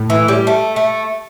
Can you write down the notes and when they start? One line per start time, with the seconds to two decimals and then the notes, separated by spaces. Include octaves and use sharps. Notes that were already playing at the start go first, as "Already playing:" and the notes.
Already playing: A2
0.10 E3
0.28 G3
0.47 A3
0.76 A3